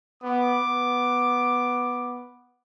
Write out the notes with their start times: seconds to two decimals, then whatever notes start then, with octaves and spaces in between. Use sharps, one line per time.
0.23 B3 D6
0.61 B3